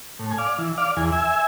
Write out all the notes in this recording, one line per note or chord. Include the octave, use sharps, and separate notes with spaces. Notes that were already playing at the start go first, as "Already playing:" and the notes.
A2
G#5
D5 F5
E3
D5 F5
E2 G#5
E5 G#5